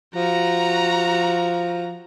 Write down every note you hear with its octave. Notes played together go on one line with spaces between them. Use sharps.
F3 F#4 A#5